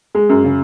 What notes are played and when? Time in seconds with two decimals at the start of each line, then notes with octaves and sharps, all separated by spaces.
0.15 G#3
0.29 F#2
0.44 C#3